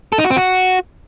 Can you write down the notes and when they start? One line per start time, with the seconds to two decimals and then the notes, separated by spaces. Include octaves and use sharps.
0.12 A4
0.18 D#4
0.24 F#4
0.30 C4
0.36 F#4